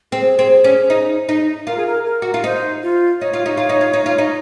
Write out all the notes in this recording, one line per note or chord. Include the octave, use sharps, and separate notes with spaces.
C4 G#4
C4
C#4
D#4
D#4
F4 A#4
G#4
A#4
A#4
F#4
F4
D#4 C5
F4
D#4 C#5
F4
D#4
F4
D#4
F4
D#4
F4
D#4